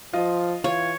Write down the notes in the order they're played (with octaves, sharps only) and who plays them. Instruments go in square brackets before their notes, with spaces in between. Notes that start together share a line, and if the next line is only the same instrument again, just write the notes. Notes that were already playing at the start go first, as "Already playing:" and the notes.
[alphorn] F3 [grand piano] F4 D#5
[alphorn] E3 [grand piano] F4 [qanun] C#5